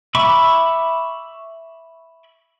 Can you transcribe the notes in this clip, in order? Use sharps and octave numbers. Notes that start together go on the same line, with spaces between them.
E5 B5 C#6 D6